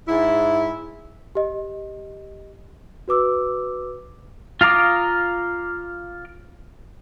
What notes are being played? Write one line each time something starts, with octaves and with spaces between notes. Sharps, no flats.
G#2 E4
G4 D#5
F#4 B4 D6 E6
F4 F5 A#5 D6 D#6